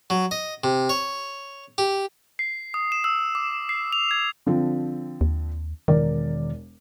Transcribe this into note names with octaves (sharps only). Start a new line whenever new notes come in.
F#3
D#5
C3
C#5
G4
C7
D#6
E7
E6
D6
C7
F7
G#6
D3 F3 C4
D#2
E1 D#3 A#4 D5